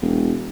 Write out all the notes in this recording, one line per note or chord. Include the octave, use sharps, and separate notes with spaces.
E1